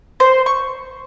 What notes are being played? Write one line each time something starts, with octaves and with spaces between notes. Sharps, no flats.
C5
C#6